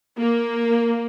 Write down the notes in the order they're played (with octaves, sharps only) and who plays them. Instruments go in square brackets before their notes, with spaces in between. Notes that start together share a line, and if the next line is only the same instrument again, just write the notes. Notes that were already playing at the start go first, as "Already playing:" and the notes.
[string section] A#3